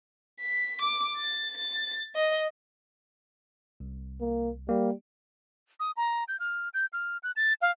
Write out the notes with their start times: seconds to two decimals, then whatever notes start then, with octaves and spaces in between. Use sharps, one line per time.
0.41 B6
0.82 D6
1.16 A6
1.57 A6
2.15 D#5
3.80 C2
4.21 A#3
4.69 G3 A#3
5.80 D#6
5.97 A#5
6.28 G6
6.40 F6
6.74 G6
6.93 F6
7.23 F#6
7.36 A6
7.62 F5